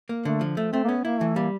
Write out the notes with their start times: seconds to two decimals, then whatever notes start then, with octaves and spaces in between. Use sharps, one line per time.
0.09 A#3
0.25 D3 A3
0.41 F3
0.57 A3
0.72 A3 C4
0.85 A#3
0.89 B3 C#4
1.05 A#3 E4
1.20 E3 A3
1.36 G3 A#3